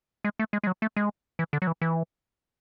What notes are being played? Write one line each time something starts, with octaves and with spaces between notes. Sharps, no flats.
G#3
A3
G#3
G#3
F#3
A3
G#3
E3
D3
F#3
E3
E3